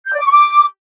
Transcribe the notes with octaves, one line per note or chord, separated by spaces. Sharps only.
G6
D5
D6
C#6
D6